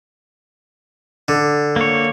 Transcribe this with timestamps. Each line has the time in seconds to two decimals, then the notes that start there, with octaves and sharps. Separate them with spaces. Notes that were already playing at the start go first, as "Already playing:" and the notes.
1.28 D3
1.76 A#3 C#5